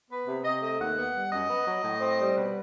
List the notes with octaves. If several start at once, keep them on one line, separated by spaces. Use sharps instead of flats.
B3 B4
C3
C3 D#5
A3 D#5
D#2 F#5
B3
G3
F#2 D#5
B3
F#3
A2
C4
G3
B2 B4